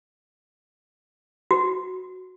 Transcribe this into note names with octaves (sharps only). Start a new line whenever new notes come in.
F#4